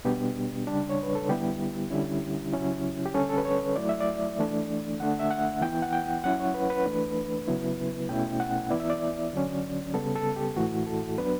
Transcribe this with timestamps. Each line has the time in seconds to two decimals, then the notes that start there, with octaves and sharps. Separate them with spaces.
0.05 B2 G3 B3 D4 G4
0.67 C#3 G3 D4
0.89 C#5
1.03 B4
1.15 A4
1.28 D3 G3 B3 E4 G4
1.90 D3 G3 C#4 E4
2.53 C#3 F#3 C#4 E4
3.05 G4
3.14 D3 G3 C#4 A4
3.29 A4
3.37 B4
3.45 C#5
3.76 F#3 A3 E4 D5
3.89 E5
4.00 D5
4.39 E3 A3 D4
5.00 D3 A3 D4 F#5
5.19 E5
5.31 F#5
5.61 E3 B3 E4 G5
5.82 F#5
5.93 G5
6.24 F#3 C#4 E4 F#5
6.40 C#5
6.54 B4
6.70 B4
6.86 E3 A3 D4
7.47 C#3 F#3 B3 E4
8.09 B2 A3 C#4 E4 G5
8.40 F#5
8.70 E3 B3 E4 D5
8.80 E5
8.90 D5
9.33 D3 F#3 C#4
9.94 C#3 G3 B3 A4
10.15 A4
10.36 G4
10.56 A2 E3 A3 E4 F#4
10.87 A4
11.18 F#3 B3 D4 B4